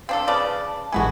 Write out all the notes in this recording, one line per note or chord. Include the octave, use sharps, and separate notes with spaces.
C4 D4 A4 F5
C#3 B4 D5 A5
A1 E3 G#3 B3 F#4 G#5